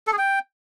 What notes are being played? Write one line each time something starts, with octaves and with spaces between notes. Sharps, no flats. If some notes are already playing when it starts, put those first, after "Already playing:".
A4
G#4
G5